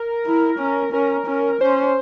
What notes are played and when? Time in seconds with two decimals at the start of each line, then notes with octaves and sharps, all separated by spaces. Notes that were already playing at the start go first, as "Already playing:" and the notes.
Already playing: A#4
0.26 E4
0.59 C#4
0.93 C#4 A#4
1.27 C#4
1.61 C#4 C5